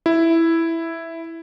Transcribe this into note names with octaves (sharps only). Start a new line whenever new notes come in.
E4